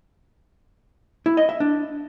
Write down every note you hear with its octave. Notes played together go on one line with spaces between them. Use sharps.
E4
D#5
E5
D4